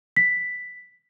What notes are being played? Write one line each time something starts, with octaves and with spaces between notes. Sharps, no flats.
B6